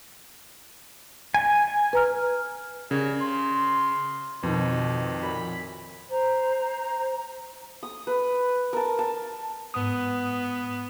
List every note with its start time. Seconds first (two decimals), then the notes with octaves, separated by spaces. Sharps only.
1.34 G#5
1.93 B4 A#5 F6
2.91 C#3 G3 A#4 C#5
3.21 C6
4.43 F2 B2 D#3
5.23 F#2 A#2 B5
6.10 C5 A#5
7.83 D#6
8.07 B4
8.73 A#4 A5
8.99 A5
9.74 G#2 B3 D#6